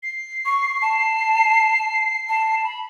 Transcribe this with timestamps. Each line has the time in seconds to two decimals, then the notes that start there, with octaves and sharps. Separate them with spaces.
0.03 C7
0.46 C#6
0.82 A5
2.29 A5
2.64 B5